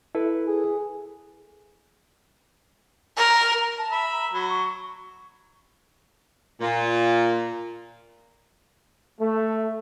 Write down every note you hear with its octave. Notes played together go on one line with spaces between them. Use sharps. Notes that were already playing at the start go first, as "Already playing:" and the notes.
E4 A4 B4
G#4
A#4
A5
E5 B5
A#5
F#3 B5
C#6
A#2
A3